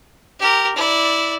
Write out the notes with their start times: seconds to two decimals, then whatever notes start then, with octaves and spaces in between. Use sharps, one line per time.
0.39 G4 A#4
0.76 E4 D5